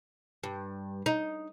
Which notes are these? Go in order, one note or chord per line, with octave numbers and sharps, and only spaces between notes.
G2
D#4